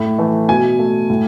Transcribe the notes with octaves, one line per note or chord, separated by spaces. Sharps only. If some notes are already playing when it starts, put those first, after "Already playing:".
Already playing: A2
E3 A3
B2 G#5
A3
A2